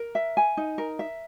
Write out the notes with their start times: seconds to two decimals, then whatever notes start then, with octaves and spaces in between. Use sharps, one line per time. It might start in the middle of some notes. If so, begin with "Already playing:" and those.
Already playing: A#4
0.15 E5
0.37 G#5
0.57 D#4
0.78 A#4
0.99 E5